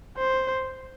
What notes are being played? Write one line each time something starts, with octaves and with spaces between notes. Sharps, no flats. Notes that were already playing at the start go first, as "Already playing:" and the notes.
C5